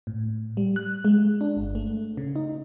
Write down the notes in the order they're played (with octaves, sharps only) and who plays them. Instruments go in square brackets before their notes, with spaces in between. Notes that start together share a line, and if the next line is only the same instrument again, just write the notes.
[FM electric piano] A2
G3
F#6
G#3
D4
G1
A3
C#3
D#4